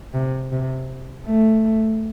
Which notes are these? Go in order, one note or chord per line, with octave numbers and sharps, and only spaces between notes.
C3
C3
A3